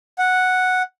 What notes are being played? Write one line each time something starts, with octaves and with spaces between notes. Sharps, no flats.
F#5